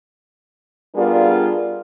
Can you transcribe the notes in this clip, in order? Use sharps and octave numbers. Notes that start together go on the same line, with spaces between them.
G3 B3 D4 F4 G#4 A#4